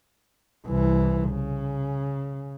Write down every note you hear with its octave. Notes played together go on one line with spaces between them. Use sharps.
C2 E3
C#3